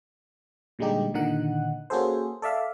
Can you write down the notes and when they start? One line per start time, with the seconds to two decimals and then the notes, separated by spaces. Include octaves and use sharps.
0.79 A#2 D3 G3 G#3 D#4 G4
1.14 A#2 D3 D#3 D#4 F#5 F#6
1.90 A#3 C#4 F#4 G#4 A4 C5
2.42 A4 D5 E5 F5